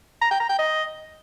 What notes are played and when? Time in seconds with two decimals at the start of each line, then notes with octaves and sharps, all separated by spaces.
0.22 A#5
0.31 G5
0.40 A#5
0.49 G5
0.59 D#5